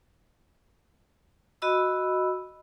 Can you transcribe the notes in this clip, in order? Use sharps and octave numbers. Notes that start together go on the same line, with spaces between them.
F#4 D#5 B5 E6